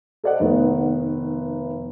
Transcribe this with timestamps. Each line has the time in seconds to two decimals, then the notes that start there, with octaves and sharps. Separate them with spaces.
0.24 A4 C5 D5 D#5 F#5
0.40 F1 D#3 B3